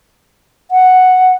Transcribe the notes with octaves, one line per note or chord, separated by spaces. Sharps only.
F#5